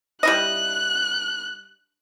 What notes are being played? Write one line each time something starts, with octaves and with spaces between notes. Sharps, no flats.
G3 E4 D#5 F#6